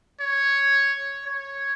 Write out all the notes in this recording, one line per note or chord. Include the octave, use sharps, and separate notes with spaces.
C#5
C#5